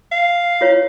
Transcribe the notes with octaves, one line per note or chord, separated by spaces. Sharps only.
F5
E4 F4 C#5